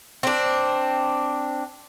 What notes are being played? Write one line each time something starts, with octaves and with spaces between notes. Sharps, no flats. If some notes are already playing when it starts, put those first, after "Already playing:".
C4 D4